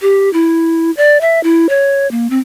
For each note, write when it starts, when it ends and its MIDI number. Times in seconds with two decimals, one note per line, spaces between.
0.02 0.31 67
0.33 0.91 64
0.97 1.20 74
1.21 1.42 76
1.43 1.67 64
1.69 2.09 73
2.11 2.30 58
2.30 2.39 60